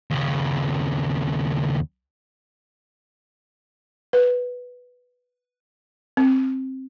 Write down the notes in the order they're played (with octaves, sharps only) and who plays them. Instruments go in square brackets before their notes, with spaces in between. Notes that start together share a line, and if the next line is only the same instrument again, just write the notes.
[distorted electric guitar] D#2 C#3
[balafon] B4
C4